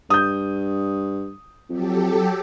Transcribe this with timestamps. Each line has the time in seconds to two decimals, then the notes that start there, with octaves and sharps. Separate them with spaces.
0.10 G2 D#6 G6
1.69 F2 F#3 G4 A4